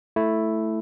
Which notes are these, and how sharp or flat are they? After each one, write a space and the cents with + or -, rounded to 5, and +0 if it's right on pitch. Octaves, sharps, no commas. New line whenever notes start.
A3 +0 E4 +0